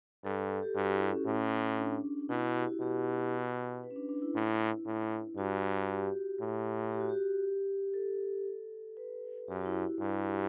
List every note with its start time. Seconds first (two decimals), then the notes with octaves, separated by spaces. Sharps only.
0.24 G2 A4
0.37 A4
0.50 A4
0.63 G4
0.75 G2 F#4
0.93 E4
1.10 C#4
1.26 A2 C#4
1.78 D4
2.29 B2 E4
2.42 F#4
2.56 G4
2.67 F#4
2.81 B2 G4
3.83 B4
3.91 C#4
3.96 D4
4.09 D4
4.22 E4
4.35 A2
4.86 A2
5.37 G2 F#4
5.89 G4
6.41 A2
6.92 G4
7.00 F#4
7.09 G4
7.94 A4
8.97 B4
9.48 F#2 G4
9.61 F#4
9.66 E4
9.82 E4
10.00 G2